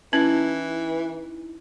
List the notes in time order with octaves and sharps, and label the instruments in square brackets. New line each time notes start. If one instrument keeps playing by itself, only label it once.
[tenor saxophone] E3 [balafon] C#4 [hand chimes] D#4 E4